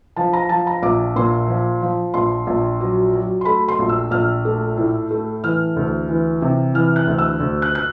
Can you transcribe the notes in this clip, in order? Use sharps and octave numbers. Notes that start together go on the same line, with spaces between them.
F3 A5
A#5
F3 A5
A#5
A#1 D6
A#2 C6
F3
F3
A#1 C6
A#1
F#3
F#3
C6
A3 B5
C6
A#1
E6
A#1 F6
A3
A2
A3
E3 F6
D2
E3
C3
E3 F6
F#6
D2
E6
D2
F#6
F#6